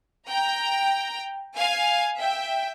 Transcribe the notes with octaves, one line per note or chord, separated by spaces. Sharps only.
G5 A#5
F5 G#5
E5 G5